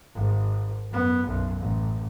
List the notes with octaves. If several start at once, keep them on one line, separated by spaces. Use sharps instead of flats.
G#1
F#2 B3
B1 F#2
A1